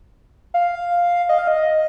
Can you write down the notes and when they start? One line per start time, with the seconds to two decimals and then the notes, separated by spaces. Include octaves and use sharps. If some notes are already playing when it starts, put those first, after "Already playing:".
0.54 F5
1.29 D#5
1.38 F5
1.47 D#5